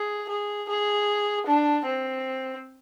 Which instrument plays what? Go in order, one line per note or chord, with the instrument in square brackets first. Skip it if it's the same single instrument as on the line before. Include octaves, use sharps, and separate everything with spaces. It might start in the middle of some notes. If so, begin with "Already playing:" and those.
Already playing: [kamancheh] G#4
G#4
G#4
D4
C4